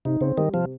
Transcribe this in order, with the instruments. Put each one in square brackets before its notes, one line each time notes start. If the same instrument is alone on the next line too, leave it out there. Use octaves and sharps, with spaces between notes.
[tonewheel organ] C3 [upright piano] D#4
[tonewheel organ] C#3 [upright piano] C4
[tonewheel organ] D#3 [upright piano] G3
[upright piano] C3 [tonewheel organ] F3